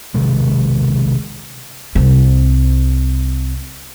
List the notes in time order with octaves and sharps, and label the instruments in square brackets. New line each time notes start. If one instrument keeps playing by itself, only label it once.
[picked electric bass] B1 C3 D#3 G#3
[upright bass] C2 C4